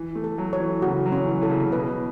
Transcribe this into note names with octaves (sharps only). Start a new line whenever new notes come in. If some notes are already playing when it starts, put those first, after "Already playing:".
Already playing: E3
A3
A4
F#3
C#5
E3
C#3 F#4
F#3
C#4
E3
E3 A4
C#3
C#3
B2 B4